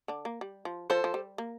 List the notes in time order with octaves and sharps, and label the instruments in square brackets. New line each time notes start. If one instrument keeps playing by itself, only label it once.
[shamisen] D3 D4
A#3
G3
F3
[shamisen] F3 [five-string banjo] A4 C5
[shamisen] F3
G3
A#3